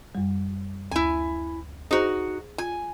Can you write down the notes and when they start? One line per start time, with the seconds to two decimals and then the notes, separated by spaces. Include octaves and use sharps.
0.15 F#2 G3
0.91 D2 E4 G#5
1.91 D#4 F#4 G#4 C5
2.58 F4 G#5